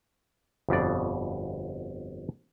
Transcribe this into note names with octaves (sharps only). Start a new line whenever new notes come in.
G1 F2 B2 D5